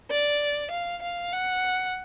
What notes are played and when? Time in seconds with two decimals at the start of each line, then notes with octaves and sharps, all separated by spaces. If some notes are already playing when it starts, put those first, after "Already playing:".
0.11 D5
0.71 F5
1.02 F5
1.33 F#5